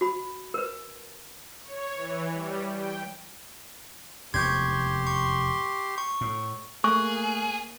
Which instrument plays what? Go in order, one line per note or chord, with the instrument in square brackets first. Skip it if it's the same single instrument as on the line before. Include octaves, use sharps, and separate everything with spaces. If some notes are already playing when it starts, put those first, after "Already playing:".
[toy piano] F#4 B5
A#4 B4
[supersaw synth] C#5
E3
G3
G5
[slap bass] F1 E2 G#2 [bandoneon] G4 C6 [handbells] C#6 G6 G#6
[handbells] C#6
C#6
[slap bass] A2
[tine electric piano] A3 F#6 [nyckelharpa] A#3 [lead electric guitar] G#4 [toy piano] C#6